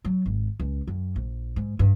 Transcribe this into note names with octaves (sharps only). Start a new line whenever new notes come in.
F#3
G#1
C#2
F#2
A#1
G#2
G2